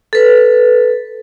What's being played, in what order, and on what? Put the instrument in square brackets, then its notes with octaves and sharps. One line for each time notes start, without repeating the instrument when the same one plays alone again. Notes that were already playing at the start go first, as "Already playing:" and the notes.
[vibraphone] A4 B4